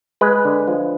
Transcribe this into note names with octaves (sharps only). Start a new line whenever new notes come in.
G#3 B4
D3
F3